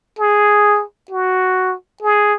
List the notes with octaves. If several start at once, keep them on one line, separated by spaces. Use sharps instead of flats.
G#4
F#4
G#4